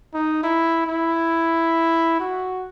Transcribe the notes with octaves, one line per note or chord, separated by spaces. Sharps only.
D#4
E4
E4
F#4